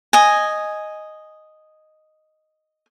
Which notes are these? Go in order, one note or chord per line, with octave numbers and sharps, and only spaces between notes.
D#5 G#5